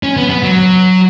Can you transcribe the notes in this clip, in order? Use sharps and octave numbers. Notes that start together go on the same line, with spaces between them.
C#4
B3
B3
F#3